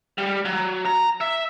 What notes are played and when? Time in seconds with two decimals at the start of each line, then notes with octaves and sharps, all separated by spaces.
0.18 G3
0.45 F#3
0.85 A#5
1.21 E5